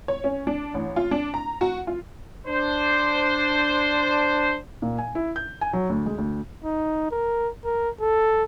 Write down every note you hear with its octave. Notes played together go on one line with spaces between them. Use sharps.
C#5
C#4
D4
A1
F4
D4
A#5
F#4
F4
D4 C5
A#2
G#5
E4
G6
G#5
F#3
D2
G#3
D2
D#4
A#4
A#4
A4